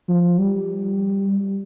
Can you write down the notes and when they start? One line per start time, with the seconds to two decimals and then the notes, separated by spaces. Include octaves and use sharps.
0.09 F3
0.39 G3